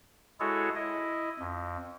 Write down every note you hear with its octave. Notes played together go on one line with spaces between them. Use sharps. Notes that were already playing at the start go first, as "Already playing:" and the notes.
G#3 E4 F#4 G#4 A4 C#5
E4 D#5
F2